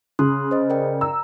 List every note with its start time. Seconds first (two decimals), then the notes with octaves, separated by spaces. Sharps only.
0.19 C#3 C6 D#6 F#6
0.51 C5 D#5
0.70 A#4 D5 G5
1.01 A#5 E6